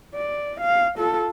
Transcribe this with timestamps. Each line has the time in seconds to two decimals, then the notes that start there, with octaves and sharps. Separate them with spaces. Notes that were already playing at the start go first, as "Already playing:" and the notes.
0.15 D5
0.61 F5
0.97 F4 A4